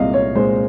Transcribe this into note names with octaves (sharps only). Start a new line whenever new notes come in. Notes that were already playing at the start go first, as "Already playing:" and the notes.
Already playing: C2 A#2 G#3 D#5 F5
C#5
A#2 G#3 C5